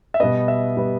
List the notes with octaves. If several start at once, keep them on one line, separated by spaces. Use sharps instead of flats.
E5
B2 G3 B3 D#5
E5
B2 G3 B3